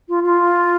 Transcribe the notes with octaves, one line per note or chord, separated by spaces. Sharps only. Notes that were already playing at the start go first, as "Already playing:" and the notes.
F4
F4